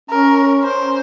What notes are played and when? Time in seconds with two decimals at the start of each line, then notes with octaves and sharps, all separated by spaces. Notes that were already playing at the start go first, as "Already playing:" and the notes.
0.10 C#4 A#4
0.63 C5